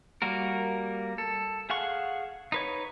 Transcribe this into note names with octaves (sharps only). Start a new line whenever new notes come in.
G3 A#3 F#4 A#4
A4
G#4 F5 F#5 C#6
D#4 B4 C#5